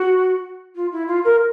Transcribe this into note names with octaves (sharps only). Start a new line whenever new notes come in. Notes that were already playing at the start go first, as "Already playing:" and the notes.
Already playing: F#4
F4
E4
F4
A#4